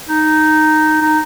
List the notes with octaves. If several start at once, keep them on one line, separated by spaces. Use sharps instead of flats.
D#4
D#4